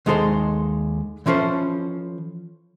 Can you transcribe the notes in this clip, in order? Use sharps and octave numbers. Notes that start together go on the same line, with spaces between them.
D#2 G#3 D#4 A4 C5
E3 F3 C#4 A4 C5